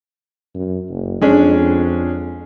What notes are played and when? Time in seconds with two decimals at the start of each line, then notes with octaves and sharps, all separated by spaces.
0.55 F#2
0.90 F#1
1.21 F2 G#3 C#4 D4